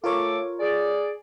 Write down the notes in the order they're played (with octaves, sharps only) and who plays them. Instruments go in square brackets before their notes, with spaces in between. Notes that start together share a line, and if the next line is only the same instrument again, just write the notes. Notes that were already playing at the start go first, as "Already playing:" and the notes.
[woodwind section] A3 A4 D6 [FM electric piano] F4 A#4 C#5
[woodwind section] G#4 D5